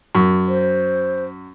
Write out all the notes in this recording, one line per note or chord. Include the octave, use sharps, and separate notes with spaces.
F#2
C5